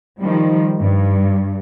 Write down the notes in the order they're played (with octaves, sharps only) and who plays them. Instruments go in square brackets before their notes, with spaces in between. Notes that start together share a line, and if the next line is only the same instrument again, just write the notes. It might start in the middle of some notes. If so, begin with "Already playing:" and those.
[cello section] D#3 F3 G3
G2